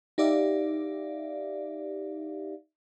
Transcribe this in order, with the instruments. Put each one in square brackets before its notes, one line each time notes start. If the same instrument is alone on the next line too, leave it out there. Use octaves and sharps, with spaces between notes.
[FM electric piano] D#4 G4 D5 E5 F5